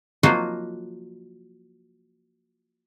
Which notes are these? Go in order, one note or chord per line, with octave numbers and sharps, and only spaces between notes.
F3 F#3 A#3 D#4 F4 F#4